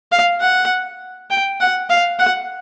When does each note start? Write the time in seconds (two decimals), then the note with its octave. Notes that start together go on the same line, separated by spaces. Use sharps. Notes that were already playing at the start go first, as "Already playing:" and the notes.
0.12 F5
0.41 F#5
1.30 G5
1.60 F#5
1.90 F5
2.19 F#5